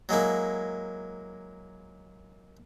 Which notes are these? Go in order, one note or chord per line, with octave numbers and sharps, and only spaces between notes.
F#3 G#3 A#3 E4